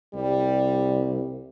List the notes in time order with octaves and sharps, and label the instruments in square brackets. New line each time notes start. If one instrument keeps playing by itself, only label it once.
[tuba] C2 [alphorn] G3